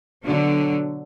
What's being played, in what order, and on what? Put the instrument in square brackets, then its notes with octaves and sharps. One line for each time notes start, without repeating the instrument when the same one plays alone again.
[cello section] B2 D3 F#3